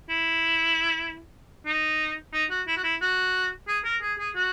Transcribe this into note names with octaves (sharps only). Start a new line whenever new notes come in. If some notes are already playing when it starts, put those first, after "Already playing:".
E4
D#4
D#4
F#4
E4
F#4
E4
F#4
G#4
A#4
G#4
G#4
F#4